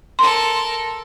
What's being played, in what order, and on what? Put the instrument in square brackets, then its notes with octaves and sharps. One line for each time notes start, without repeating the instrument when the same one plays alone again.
[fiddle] A4 A#4 [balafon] C6